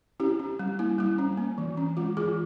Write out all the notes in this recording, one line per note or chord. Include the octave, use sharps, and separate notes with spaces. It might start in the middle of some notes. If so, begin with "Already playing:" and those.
C#4 E4 G4
C#4
G3
A#3 E4
G3 E4
C#4
A#3
E3
C#4
G#3 F4
E3 F4 G#4